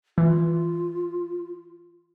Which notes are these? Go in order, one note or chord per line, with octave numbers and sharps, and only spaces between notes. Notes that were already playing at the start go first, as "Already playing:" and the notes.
E3 F4